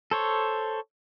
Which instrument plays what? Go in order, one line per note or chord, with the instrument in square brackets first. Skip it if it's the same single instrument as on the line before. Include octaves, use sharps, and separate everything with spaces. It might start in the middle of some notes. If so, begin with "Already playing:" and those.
[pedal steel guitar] A4 C5 C#5